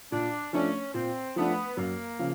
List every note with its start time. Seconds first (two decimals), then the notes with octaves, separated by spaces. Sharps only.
0.12 A#2 D4
0.53 F3 A3 C#4 D4
0.94 A#2 C4
1.36 F3 A3 B3 D4
1.77 F#2 A#3
2.19 C#3 F3